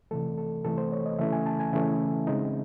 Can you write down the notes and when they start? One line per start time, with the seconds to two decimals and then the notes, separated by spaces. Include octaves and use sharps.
0.11 C3 E3 A3 A4
0.38 A4
0.65 C3 E3 A3 A4
0.78 C5
0.92 C#5
1.06 D#5
1.19 C#3 E3 A3 C#4 E4 E5
1.32 G#5
1.46 A5
1.60 G#5
1.73 C#3 E3 A3 C#4 E4 E5
2.27 C#3 G#3 C4 D#4